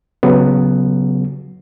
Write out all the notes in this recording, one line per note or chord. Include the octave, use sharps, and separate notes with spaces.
C#3 F#3 B3